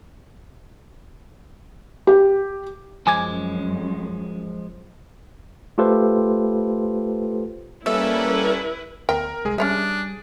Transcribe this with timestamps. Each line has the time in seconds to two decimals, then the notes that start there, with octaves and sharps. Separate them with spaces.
2.07 G4
3.07 F#2 F3 G#3 G#5 D6 G#6
5.78 A3 F4 G4 A4 B4 C5
7.86 G3 A#3 C#4 E4 A4 B4 E5
9.09 D2 B3 A#4 G5
9.45 C2 G#3 G#4
9.58 G3 C#4 D4 G#4 C#5 E5